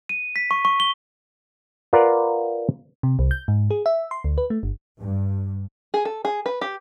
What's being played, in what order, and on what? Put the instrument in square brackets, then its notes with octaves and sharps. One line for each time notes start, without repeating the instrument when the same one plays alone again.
[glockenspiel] D#7
B6
C#6
C#6
G7
[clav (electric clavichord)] F4 A#4 B4 D5 F#5
[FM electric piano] C3
C2
G6
G#2
G#4
E5
C6
D2
B4
A3
G1
[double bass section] G2
[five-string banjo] G#4
A4
G#4
B4
G4